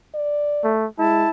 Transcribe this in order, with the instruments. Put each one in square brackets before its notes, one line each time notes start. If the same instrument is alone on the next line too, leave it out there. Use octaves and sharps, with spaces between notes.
[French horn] D5
[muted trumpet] A3
[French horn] G#3 [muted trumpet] E4 [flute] A5